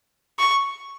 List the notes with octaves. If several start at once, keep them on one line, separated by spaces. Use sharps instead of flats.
C#6